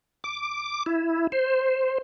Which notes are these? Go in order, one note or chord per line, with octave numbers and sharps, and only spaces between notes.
D6
E4
C5